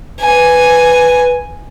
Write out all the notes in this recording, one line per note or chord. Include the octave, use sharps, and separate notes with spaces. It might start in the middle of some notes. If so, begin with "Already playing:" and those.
B4 G#5